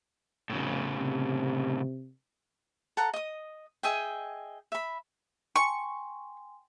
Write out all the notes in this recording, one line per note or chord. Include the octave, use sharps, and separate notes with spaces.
F1 A2 C#3
C3
A4 F#5 A#5
D#5 D#6
G#4 D#5 E5 G5
E5 B5
G5 G#5 C6 C#6